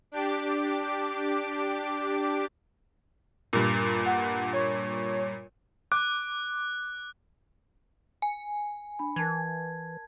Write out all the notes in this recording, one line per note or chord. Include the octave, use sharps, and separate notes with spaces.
D4 G4 D6
G2 A#2
F#5
C#5
D6 F#6
G#5
D4 B5
E3 A#4 A5 G#6